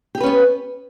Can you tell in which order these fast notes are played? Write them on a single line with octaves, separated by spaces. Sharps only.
G4 G#4 B4 C#4 B3